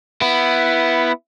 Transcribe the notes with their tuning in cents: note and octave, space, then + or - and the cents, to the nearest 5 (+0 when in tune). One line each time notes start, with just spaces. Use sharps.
B3 +0 E4 +10